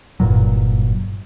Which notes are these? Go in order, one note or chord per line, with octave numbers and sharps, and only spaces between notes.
F#1 G2 A#2 F#3